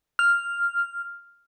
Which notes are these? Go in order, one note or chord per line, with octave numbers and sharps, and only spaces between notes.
F6